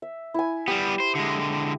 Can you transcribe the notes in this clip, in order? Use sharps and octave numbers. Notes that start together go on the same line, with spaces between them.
E5
E4 G#5
G3 B3 G4
C5
D3 G#3